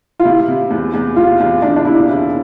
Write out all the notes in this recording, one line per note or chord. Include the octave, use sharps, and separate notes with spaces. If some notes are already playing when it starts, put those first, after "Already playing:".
F4
C3 E4
C3
E2
E2
C3 F4
E2
E2 D4
D4
C3 E4
E1